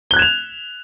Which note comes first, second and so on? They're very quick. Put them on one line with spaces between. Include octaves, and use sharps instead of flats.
G7 F#6 G#6 E7 F7